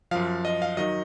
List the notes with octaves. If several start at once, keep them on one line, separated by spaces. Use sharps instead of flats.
F#2 F3 F5
D#5
F5
D#3 F#3 D#5